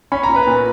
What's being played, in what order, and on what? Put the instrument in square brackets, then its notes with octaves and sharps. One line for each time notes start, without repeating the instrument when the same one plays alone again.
[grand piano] C#4 B5
A#5
A#2
B4 B5
A#2